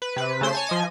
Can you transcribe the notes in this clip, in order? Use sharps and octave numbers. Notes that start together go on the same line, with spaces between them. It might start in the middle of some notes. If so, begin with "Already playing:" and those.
B4
C3 B4
C#3 A3 C5 C6 B6
C#5 G#5 A5
F3 D#5 G#5